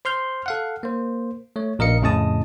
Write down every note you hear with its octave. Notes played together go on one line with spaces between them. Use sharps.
C5 C6 F6 G6
A4 F5 F#5
A#3 C5
A3 C#5
A#1 A#4 D#5 F5 C#7
F2 A2 C#3 D#5 A5 D#6